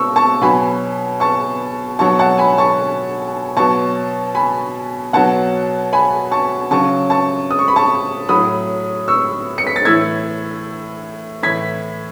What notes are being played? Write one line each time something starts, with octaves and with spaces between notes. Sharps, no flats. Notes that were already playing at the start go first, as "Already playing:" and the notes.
Already playing: B2 C#6 E6
A5 C#6
B2 F#3 G#5 B5
A5 C#6
B2 F#3 A5 C#6
F#5 A5
G#5 B5
A5 C#6
B2 F#3 A5 C#6
G#5 B5
B2 F#3 F#5 A5
G#5 B5
A5 C#6
C#3 F#3 A5 C#6
A5 C#6
D#6
C#6
B5
A5 C#6
A2 F#3 B5 D#6
C#6 E6
C#7
B6
A6
A2 E3 E6 G#6
A2 E3 G#6 B6